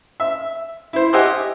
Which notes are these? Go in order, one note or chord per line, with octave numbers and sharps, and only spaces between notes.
E5
E4 C5
G4 C5 D#5 E5 F#5 G#5